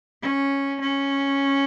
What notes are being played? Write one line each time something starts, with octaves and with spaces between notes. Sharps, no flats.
C#4
C#4